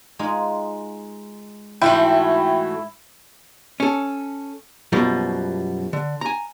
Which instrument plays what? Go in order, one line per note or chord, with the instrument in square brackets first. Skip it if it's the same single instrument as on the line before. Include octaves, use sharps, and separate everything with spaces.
[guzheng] G#3 D#4 F4
[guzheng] G#2 C6 [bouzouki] E3 A3 F#4 [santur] E4 [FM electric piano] G5
[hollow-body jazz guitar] C#4 A4
F#2 B2 F3 G3 A#3
D3
G#5 A#5